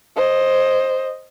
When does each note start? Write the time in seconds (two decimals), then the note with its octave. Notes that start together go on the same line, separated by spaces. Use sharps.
0.16 C5 D#5